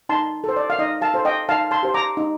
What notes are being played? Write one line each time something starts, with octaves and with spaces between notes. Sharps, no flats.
D#4 A5 C6
A4 C5
D5
F5
D#4 D#5
F5 A5
A4 C5
D#5 G5
D#4 F5 A5
A5 C6
G4 C5
A#5 D6
D#4